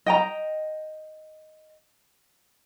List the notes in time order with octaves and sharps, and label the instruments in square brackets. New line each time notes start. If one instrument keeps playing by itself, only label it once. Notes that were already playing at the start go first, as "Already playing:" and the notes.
[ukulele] D#5 G5 A#5